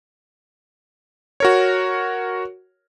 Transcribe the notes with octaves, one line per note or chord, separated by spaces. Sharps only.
F#4 A#4 C#5